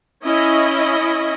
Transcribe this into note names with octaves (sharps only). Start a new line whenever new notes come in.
C#4 E4 D#5